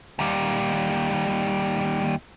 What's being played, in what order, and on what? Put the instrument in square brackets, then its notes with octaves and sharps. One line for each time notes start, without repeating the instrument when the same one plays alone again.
[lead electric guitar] D#2 G3